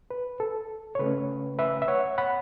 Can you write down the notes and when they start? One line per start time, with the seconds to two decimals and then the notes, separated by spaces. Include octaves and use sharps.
0.11 B4
0.40 A4
0.95 C#5
0.99 C#3 A3 C#4 B4
1.59 B4 E5
1.82 E5
1.88 C#5 F#5
2.18 F#5 B5